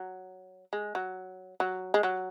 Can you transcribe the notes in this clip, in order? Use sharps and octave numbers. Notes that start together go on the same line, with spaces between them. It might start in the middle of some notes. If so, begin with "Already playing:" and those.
Already playing: F#3
G#3
F#3
F#3
G#3
F#3